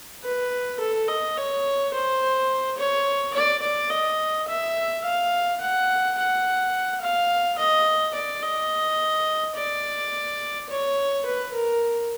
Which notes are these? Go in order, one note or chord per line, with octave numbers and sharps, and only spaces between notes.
B4
A4
D#5
C#5
C5
C#5
D5
D5
D#5
E5
F5
F#5
F#5
F5
D#5
D5
D#5
D5
C#5
B4
A#4